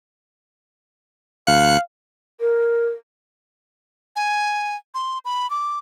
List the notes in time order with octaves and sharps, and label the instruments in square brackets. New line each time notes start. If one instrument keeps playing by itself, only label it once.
[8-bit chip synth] D2 F#6 C#7 [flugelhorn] F5
[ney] A#4
[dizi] G#5
C6
B5
D6